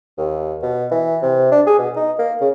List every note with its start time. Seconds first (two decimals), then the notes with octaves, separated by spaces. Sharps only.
0.17 D#2
0.62 B2
0.91 E3
1.22 C3
1.51 D4
1.67 G#4
1.78 B2
1.96 D#4
2.19 A#3
2.41 C#3